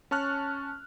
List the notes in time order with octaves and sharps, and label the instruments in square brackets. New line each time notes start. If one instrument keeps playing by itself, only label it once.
[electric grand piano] C#4 A5 C#6 F6 F#6